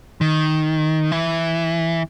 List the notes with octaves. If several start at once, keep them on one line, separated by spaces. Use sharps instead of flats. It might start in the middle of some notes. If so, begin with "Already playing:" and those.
D#3
E3